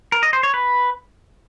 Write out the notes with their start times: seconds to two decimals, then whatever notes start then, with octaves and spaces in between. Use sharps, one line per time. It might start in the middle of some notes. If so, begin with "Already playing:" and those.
0.12 A#4
0.23 D#5
0.33 C5
0.43 C#5
0.54 B4